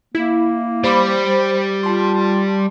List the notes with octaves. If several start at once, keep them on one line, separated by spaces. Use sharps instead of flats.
A#3 E4
G3 C5 B5 D6
F4 A5 C6